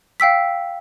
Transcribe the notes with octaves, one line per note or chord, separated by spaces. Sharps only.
F5 G5 E6 B6